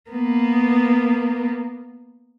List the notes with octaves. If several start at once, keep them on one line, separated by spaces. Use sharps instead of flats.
A#3 B3